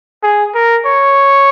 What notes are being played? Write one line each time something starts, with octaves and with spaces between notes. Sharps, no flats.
G#4
A#4
C#5